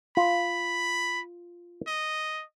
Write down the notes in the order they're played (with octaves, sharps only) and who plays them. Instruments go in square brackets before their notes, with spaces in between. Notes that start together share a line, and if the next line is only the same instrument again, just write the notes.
[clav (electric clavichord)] F4 [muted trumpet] B5
[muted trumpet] D#5